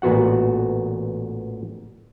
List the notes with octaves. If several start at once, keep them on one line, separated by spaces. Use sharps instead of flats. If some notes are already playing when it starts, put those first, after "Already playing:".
A1 A#2 B3 F#4 F#5